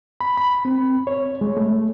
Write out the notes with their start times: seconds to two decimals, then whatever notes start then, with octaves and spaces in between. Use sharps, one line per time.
0.21 B5
0.37 B5
0.65 C4
1.07 C#5
1.41 G#3
1.57 A3